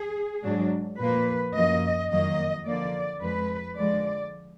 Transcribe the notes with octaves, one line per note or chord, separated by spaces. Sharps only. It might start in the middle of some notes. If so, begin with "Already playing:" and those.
Already playing: G#4
G#2 F#3 D4
A#2 F3 A#3 B4
F#2 F3 A#3 D#5
F2 D#3 F#3 A#3 D#5
D3 F3 A#3 D5
F2 F3 G#3 B4
D3 F3 G#3 D5